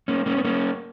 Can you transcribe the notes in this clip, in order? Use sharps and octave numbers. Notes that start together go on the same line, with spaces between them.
A#3 C#4
A#3 C#4
B3
A#3 C#4